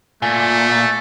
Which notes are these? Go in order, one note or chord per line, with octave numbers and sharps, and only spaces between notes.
A#2 A3 G#5